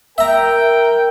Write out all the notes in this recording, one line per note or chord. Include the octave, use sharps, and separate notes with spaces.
A#4 E5 G5 A#5